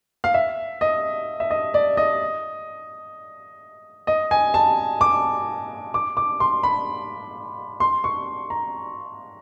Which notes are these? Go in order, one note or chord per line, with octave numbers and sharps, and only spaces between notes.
F5
E5
D#5
E5
D#5
D5
D#5
D#5
G#5
A5
D6
D6
D6
C6
B5
C6
C#6
A#5